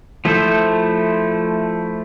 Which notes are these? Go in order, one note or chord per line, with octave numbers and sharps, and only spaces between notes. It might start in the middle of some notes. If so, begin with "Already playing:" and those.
F3 A3 E4 A4 C5